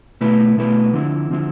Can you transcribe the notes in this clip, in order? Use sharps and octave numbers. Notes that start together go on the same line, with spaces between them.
B2 A3 E4 B4
B2 A3 E4 B4
D3 F3 C4 E4
D3 F3 C4 E4